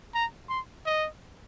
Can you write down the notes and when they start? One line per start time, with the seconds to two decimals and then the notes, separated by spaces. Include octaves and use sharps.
0.14 A#5
0.49 C6
0.86 D#5